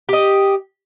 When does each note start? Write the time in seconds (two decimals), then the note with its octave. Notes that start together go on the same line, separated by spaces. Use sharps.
0.09 G4 D#5